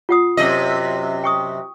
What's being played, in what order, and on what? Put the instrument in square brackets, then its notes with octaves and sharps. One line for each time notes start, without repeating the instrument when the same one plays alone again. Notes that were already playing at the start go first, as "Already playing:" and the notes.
[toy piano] F4 F#5 D#6
[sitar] F#2 C3 D#5
[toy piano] G5 C#6 D#6